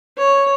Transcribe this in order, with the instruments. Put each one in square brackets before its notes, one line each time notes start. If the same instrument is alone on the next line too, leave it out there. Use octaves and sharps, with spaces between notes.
[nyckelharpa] C#5